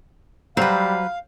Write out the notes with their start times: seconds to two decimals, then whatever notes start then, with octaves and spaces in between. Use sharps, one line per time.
0.57 F#3 G3 B4 C5 F5